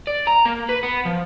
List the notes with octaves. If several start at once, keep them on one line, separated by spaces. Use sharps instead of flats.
D5
A#5
A#3
B4
B3
F3